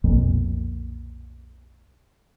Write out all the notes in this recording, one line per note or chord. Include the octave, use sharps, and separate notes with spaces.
B1 F2 A#2